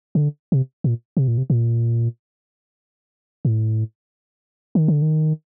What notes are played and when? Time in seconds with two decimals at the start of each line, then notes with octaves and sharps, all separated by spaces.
0.15 C3
0.19 D3
0.52 C3
0.84 A#2
1.17 C3
1.28 A#2
1.38 C3
1.50 A#2
3.45 A2
4.75 D#3
4.88 D3
5.02 D#3